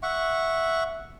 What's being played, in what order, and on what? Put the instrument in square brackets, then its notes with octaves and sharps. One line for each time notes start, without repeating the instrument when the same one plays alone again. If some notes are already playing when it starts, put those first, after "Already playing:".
[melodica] E5 F#5 C#6